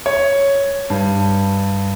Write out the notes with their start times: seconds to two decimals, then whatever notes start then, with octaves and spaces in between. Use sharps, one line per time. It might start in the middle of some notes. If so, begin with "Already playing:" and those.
0.06 C#5
0.90 G2